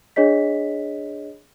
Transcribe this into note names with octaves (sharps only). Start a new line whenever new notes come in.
D4 G#4 C#5 D#5 B6